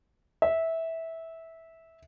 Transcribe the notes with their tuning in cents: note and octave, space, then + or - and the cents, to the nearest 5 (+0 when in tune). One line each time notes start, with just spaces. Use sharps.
E5 -15